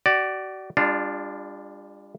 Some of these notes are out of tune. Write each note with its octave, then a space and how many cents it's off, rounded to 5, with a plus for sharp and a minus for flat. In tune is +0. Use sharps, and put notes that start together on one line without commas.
F#4 +40 D5 +0
G3 +45 D4 +0 F4 +0